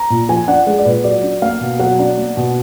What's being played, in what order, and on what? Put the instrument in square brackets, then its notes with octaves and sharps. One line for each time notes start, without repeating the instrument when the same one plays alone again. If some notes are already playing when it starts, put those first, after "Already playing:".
Already playing: [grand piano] A#5
A#2
F3 G#5
D4 F#5
G#3 F#5
D5
A#2 B4
F#3 D5
D4
A#3 F5
B2
F#3 F#5
D4
A#3
B2